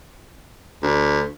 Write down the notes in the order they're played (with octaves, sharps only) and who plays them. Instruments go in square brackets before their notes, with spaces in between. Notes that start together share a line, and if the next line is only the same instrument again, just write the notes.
[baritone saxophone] D2